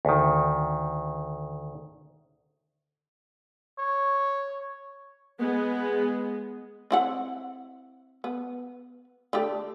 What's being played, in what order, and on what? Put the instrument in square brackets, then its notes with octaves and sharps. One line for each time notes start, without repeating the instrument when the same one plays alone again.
[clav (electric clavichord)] D2 D#3
[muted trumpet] C#5
[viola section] G#3 B3
[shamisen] C4 E4 F#5
B3
D3 A3 G4